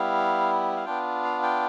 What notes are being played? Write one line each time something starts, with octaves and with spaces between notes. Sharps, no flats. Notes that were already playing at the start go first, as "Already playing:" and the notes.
Already playing: G3 B3 E4 F5
F5
B3 D4 F4 G5
F5
G5